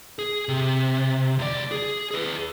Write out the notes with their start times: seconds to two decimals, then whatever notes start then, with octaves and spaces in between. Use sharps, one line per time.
0.19 G#4
0.49 C3
1.39 C#2 D5
1.71 G#4
2.11 G#4 B4